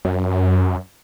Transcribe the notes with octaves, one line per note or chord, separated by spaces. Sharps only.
F#2